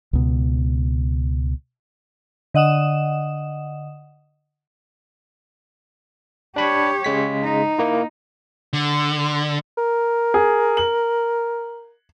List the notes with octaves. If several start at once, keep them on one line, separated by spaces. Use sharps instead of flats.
C#2 B2
D3 D#5 F#5 D#6 E7
D4 G4 C#5 B5
C#3 G#3 B6
D#4
A#3 E4
D3
A#4
G#4
F#7